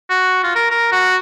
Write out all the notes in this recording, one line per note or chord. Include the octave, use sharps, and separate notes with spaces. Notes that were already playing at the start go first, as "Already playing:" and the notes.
F#4
F4
A#4
A#4
F#4